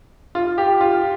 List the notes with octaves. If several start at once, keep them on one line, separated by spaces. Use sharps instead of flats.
F4
G4
F4